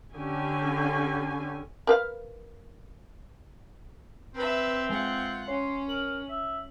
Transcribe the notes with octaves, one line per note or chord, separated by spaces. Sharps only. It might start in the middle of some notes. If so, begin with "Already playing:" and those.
D3 C#4 G4 G#5
A#4 B4 F5
C4 B4 E5
G#3 F4 F#5
C#4 C#5 C6
A#4 F#7
E5